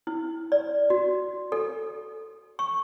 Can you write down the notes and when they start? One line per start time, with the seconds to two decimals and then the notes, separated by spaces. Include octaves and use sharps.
0.07 E4
0.52 D5
0.90 F#4
1.52 A4
2.59 C#6